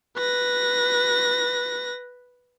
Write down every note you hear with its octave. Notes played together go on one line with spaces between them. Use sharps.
B4 A#6